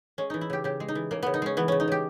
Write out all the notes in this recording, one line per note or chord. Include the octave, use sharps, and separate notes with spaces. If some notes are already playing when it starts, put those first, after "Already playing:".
G#3 C#4
E3 D#4
E4
C#3 G4
C#3 G4
G#3
D#4
E3
C#3 A#3
C#3 B3
D#4
G#3 C#4
E3 B3
C#3 C#4
D#4
C#3 G4